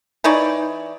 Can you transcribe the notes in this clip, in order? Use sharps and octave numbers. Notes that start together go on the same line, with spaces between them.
E3 D#4 C#5 D5